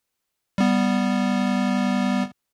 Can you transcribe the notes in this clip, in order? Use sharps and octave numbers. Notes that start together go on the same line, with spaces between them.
G3 B3